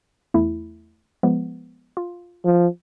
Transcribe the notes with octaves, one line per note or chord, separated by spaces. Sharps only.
E2 A3 E4
F3 G#3 B3
F4
F3